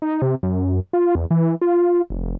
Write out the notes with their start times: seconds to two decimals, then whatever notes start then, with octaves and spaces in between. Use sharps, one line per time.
0.02 D#4
0.22 C3
0.43 F#2
0.93 F4
1.15 E2
1.31 E3
1.62 F4
2.10 F1